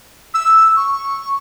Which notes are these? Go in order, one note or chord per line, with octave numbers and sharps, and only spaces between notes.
E6
C#6